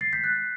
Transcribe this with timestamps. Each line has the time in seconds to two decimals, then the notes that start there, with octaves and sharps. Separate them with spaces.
0.01 A6 C7
0.13 G6 B6
0.24 F#6 A6